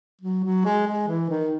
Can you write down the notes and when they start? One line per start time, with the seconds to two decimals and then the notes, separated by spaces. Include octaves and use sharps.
0.21 F#3
0.44 F#3
0.65 G#3
0.87 G#3
1.08 E3
1.30 D#3